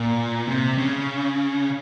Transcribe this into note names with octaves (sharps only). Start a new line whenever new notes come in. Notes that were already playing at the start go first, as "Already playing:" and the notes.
Already playing: A#2
C3
C#3